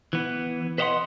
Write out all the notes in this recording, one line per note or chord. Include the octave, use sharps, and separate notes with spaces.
E3 B3
B4 C5 D#5 F5 F#5 C6